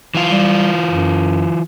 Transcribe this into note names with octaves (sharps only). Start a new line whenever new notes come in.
E3 F4
G3
F#2